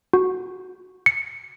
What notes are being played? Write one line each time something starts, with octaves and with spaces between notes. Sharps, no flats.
F#4
C#7